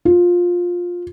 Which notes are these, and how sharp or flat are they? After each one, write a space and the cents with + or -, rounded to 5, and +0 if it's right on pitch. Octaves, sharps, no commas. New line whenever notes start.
F4 +15